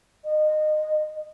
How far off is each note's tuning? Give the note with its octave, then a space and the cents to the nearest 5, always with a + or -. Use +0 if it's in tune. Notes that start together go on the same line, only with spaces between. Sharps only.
D#5 -20